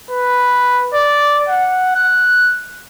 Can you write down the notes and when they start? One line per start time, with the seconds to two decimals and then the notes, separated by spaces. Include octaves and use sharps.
0.11 B4
0.94 D5
1.49 F#5
1.95 F#6